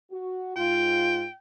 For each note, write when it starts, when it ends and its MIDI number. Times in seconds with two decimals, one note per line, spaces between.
0.12 0.56 66
0.57 1.25 44
0.57 1.25 65
0.57 1.37 79